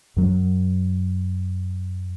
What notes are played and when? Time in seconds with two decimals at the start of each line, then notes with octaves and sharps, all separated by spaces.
0.17 F#2 F#3